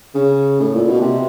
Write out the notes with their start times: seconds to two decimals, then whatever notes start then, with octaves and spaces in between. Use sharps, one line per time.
0.15 C#3
0.60 A2
0.74 A#2
0.88 B2
1.01 C3